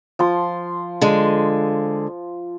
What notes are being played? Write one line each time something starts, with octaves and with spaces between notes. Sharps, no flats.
F3 C6
D3 G#3